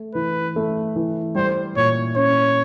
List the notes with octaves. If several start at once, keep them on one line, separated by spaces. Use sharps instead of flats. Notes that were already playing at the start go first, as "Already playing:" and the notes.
Already playing: A3
E3 B4
A3
E3
G3 C5
A#2 C#5
C#4 C#5